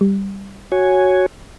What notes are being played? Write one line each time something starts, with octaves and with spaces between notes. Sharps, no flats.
G3
F#4 C#5 G#5